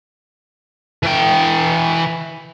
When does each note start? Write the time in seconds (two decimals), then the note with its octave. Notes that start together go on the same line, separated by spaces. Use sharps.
1.03 E3 G5